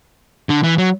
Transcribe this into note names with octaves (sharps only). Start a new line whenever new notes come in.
D3
E3
F#3